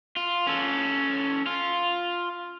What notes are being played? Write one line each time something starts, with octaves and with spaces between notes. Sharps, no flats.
F4
C#4 A4
F4